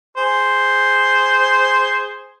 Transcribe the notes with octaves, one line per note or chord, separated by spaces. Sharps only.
G#4 C5